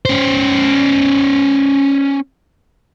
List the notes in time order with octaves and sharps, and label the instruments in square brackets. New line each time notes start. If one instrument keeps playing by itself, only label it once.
[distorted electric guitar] C#4 C5